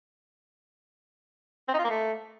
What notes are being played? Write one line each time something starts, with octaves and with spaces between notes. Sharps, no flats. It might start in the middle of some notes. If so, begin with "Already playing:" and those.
C4
D#4
F4
A#3
A3